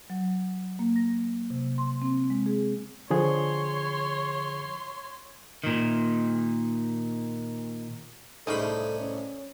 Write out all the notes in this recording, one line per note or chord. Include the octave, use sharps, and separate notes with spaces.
F#3
A#3
A#6
C3
C6
C4
G#3
G#4
D3 F3 G#4 C#5 C6
A#2 D#3
C2 A2 C#3 G#3 D#4 A4 B5
C#4